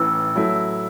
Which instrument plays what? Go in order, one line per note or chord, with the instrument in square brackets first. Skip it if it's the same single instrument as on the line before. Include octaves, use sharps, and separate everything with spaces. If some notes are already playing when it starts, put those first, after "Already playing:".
Already playing: [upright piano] A1 A2 E3 [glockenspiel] E6
[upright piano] F#3 A3 E4